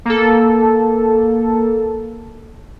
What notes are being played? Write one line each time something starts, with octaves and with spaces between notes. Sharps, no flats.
A#3 A4